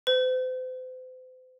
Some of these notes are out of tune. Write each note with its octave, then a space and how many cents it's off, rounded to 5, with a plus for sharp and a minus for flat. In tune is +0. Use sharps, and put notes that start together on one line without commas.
C5 -40